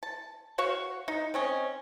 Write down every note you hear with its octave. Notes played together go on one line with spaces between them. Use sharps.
A5
F#4 C#5 F5 C#6
D#4
C4 C#4 D#5